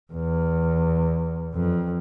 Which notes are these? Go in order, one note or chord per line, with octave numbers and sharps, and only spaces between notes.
E2
F2